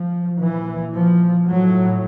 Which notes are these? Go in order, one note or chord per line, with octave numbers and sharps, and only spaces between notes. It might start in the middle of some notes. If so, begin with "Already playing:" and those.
Already playing: F3
A#2 E3
F3
A2 F#3